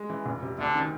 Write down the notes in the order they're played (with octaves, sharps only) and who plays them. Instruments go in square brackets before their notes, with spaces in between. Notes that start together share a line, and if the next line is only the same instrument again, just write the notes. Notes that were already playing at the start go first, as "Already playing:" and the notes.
Already playing: [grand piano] G#3
E3
F1
C3
[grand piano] D2 [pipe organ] D3
[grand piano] D#3